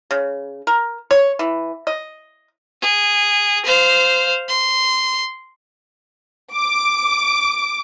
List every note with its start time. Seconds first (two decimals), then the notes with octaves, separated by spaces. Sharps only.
0.11 C#3
0.67 A#4
1.11 C#5
1.39 E3
1.87 D#5
2.82 G#4
3.65 C5 F5
4.48 C6
6.54 D6